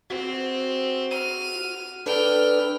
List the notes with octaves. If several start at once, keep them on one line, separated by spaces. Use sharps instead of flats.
C4 F#4
F6 D#7
D4 A4 B4 G5 F6